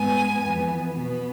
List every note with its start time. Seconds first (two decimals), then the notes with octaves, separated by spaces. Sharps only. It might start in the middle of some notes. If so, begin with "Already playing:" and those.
Already playing: G#2 G#3 B3 G#5
0.41 F2 E3 B3
0.92 B2 B3